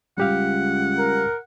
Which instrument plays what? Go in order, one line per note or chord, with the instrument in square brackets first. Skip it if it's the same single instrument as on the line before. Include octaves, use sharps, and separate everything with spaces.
[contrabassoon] C#2 [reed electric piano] G3 G4 F5 [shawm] F#5
[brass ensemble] A#4